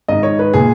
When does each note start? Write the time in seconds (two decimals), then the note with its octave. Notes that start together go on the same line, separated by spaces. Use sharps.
0.08 G#2 D#3 D#5
0.23 C#5
0.39 B4
0.54 A#2 G#4